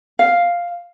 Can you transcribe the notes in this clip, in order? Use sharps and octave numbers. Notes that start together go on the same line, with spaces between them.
F5